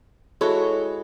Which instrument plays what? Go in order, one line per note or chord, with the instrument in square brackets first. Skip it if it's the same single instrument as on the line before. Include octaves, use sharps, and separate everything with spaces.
[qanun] G#3 E4 F#4 [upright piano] A4 C#5